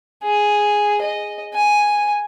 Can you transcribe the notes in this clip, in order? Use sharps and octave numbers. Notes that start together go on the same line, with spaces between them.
G#4
D#5
G#5